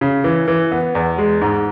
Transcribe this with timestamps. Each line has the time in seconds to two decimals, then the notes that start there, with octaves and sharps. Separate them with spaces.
0.01 C#3
0.24 E3
0.48 E3
0.72 B3
0.95 E2
1.18 G#3
1.41 G#2